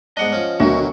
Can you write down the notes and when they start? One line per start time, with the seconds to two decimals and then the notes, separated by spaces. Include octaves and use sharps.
0.17 G#2 B3 D4 D#5 F#5
0.32 F3 C#4
0.60 D2 B2 D#3 F#3 F#4